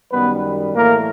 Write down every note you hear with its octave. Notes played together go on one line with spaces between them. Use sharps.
F#2 D#3 G3 B3 B4
A2 E3 A3 A#3 A#4